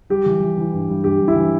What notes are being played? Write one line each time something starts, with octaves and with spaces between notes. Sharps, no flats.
G3 G4
E3
E3
E3
G2
G2
G2 G4
G2
E4
E3